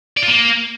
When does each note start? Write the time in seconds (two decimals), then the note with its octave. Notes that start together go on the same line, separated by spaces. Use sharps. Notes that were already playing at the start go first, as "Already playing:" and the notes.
0.17 D5
0.22 F4
0.28 A#3